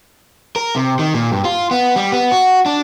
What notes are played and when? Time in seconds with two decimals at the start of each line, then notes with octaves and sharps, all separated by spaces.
0.56 A#4
0.76 C3
0.99 D#3
1.14 A#2
1.32 G2
1.45 F4
1.71 B3
1.96 G3
2.12 B3
2.32 F#4
2.66 D4